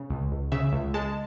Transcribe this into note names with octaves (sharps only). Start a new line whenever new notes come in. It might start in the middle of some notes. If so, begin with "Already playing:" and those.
Already playing: C#3
C#2
C#2
C#3 E5
C#2
G#3 A5